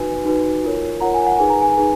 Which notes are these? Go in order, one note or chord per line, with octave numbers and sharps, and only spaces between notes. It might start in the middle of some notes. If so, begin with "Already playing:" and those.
Already playing: D#4 F#4 B4 G#5
D#4 F#4 B4
F4 A#4 C#5
F4 A#4 C#5 F#5 A#5
G#5
F#5
D#4 G#4 B4 G#5
A#5
G#5
D#4 G#4 B4